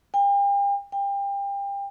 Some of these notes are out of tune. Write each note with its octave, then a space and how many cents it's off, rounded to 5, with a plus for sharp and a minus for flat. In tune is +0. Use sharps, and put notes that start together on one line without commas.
G5 +40
G5 +30